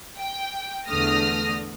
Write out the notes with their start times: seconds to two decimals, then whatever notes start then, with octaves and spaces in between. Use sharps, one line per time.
0.18 G5
0.87 E2 D3 A3 D#6 F6 A#6